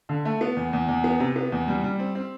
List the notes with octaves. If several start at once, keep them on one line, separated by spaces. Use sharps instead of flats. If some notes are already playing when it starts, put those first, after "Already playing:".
D3
A3
B3
E2
E2
E2
B3
C3
B3
E2
G3
G3
C4
C4